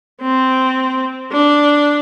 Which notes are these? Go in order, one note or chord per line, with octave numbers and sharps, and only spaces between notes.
C4
D4